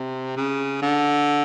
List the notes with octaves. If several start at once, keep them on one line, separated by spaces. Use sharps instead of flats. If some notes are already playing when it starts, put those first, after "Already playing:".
Already playing: C3
C#3
D3